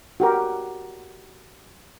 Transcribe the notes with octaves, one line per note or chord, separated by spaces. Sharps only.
F#4 G4 A#4